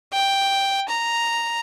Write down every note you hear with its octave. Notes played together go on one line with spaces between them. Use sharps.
G5
A#5